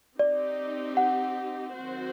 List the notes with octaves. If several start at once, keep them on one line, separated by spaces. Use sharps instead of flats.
C4 D#4 G4 D5
F#5
D#3 F#3 C4 F#4 C5